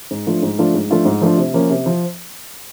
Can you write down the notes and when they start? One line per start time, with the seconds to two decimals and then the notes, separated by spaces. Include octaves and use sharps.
0.11 G#2
0.27 F3 A3 D4 F4
0.43 G#2
0.59 F3 A3 D4 F4
0.74 G#2
0.90 F3 A3 D4 F4
1.05 G#2
1.22 F3 A3 D4 F4
1.38 C3
1.54 F3 A#3 C#4
1.70 C3
1.86 F3